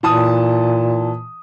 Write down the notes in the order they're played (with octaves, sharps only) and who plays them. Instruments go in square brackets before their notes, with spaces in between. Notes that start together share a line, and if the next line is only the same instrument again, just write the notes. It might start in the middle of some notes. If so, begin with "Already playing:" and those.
[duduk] A#2 [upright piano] E3 A5 D#6